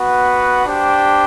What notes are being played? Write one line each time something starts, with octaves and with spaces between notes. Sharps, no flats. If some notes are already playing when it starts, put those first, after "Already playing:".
Already playing: B3 F#4 B4 F#5
D4 G4 C5 G5